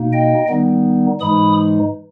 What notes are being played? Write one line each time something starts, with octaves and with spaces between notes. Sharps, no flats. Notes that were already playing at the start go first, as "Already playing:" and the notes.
Already playing: B2 A#3 D#4
D#5 G5
D#3 G3 B3 D#4
G#2 E3 G#3 D#4 B5 D#6